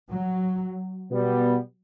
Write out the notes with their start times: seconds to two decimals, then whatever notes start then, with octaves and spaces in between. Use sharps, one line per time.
0.10 F#3
1.11 B2 G3 B3